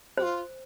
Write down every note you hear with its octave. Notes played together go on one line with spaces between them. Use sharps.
F4 G4 C5